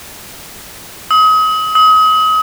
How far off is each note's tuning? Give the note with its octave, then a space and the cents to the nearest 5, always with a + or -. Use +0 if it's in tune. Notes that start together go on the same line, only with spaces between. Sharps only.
D#6 +35
D#6 +35